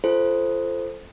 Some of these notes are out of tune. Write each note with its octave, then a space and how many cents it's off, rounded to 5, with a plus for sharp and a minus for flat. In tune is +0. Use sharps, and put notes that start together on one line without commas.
F4 -25 A4 +0 C5 +0